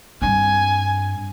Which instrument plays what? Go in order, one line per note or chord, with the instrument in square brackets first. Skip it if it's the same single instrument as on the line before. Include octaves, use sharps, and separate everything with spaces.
[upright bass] G2 C4 [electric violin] G#5